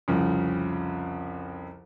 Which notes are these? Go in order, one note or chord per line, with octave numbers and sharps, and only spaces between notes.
C2 F2 C#3